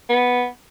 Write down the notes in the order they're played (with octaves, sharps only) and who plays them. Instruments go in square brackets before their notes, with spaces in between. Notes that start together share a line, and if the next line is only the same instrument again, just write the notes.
[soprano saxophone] B3